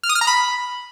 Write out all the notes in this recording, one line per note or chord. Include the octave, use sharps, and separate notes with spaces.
F6
D#6
F6
A#5
B5